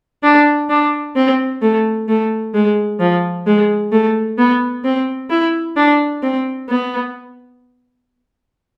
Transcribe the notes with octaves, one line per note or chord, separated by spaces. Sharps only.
D4
D4
C4
A3
A3
G#3
F3
G#3
A3
B3
C4
E4
D4
C4
B3